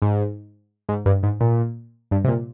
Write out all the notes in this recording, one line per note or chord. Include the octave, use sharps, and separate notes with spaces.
G#2
G#2
G2
G#2
A#2
G2
C3
A#2